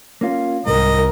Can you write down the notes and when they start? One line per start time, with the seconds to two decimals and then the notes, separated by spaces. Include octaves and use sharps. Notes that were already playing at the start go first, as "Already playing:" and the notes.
0.21 A#3 C#4 F4
0.66 C2 G#2 A#4 D#5